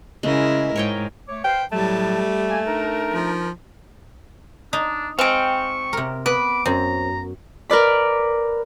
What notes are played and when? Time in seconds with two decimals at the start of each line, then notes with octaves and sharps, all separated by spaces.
0.23 C#3 G#3 E4 A#4
0.76 G#2 A#4 C#5 G5
1.28 A3 C#5 D6
1.45 B4 C5 F5 G5
1.72 A2 F#3 G3 A3 A5
2.49 A#3 G#5
2.66 D4 D#4 A#4
3.14 F3
4.73 D4 D#4
5.19 G#3 C4 F5 G5 C#6
5.93 C3 A#4
6.26 B3 B4 D6
6.66 F#2 C4 A#5
7.70 A#4 B4 D5 B5